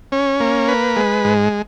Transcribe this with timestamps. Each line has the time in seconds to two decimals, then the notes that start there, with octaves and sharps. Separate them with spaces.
0.12 C#4
0.40 A#3
0.68 B4
0.96 G#3
1.25 G#2